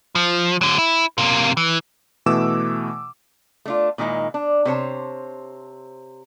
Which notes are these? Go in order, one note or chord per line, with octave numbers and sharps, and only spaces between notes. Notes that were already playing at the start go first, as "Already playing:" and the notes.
F3
D3 F#3
E4
C3 A#3
E3
B2 E3 A3 D6 E6 E7
A3 D4 F4
A#2 D#3 G#3 D#4 E4
D4
C3 C5 C#5 A5